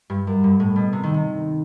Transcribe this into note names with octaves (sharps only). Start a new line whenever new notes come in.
G2
F#2
G2
A2
B2
C3
D#3
C3